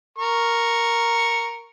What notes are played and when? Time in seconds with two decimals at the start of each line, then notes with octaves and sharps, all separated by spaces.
0.18 A#4 C#6